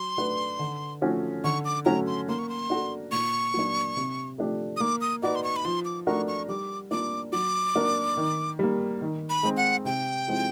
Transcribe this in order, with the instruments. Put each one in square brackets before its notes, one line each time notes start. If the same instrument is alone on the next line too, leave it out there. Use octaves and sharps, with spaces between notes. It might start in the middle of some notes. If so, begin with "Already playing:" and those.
Already playing: [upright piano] F#3 [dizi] C6
[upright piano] A3 D4 F#4 B4
D3
F3 A3 C#4 F#4
[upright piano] D3 [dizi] C#6
[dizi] D6
[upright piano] F#3 A3 C#4 F#4 [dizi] A#5
[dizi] C6
[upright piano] A#3 [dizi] C6
[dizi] C#6
C6
[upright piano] D4 F#4 A4
[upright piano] A#2 [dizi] C#6
[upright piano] F#3 A#3 D4
C3
F3 A3 D4 G4
[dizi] D#6
[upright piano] A#3 [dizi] D6
[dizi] D#6
[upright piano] D#4 F#4 B4 D5 [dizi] D6
[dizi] C6
C#6
B5
[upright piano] F3 [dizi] C6
[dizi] D6
[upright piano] A3 D4 F#4 A#4 [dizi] C#6
[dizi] C#6
[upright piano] G3 [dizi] D6
[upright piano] A#3 D4 F4 [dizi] D6
[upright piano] F#3 [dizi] D6
[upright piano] A#3 D4 F#4 A#4
D#3
G3 A#3
D#3
[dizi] B5
[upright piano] G#3 C4
[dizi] F#5
[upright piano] C3 [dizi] G5
[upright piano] F3 G#3 C4 E4